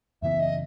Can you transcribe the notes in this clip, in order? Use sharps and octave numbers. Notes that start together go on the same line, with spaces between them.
F#2 C#3 E3 B3 E5
D#5